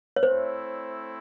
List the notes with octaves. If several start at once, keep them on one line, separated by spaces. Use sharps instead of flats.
C#5
A3 C4 E4 C5